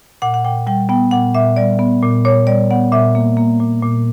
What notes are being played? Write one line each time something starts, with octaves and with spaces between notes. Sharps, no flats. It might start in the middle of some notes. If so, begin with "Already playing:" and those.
A#2 F#5
F#5
A#2 G5
G3 G5
B3 G5
A#2 F#5
A#2 E5
G3 D5
B3
A#2
A#2 C#5
G3 D5
B3 F#5
A#2 E5
A#3
A#3
A#2
A#2